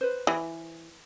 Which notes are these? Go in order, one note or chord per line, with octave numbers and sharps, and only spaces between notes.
B4 C5
E3